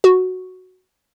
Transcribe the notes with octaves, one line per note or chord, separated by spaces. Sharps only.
F#4